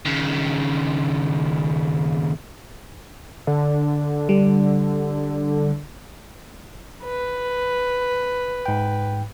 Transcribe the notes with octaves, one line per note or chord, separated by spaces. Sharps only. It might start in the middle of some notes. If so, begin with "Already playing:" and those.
D#2 C#3
D3
G3
B4
G#2 G5